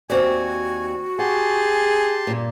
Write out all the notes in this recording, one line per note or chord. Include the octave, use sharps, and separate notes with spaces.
D#2 C4 F#4 D5 G#5
G4 G#4 F#5 A5 C6
G2 A#2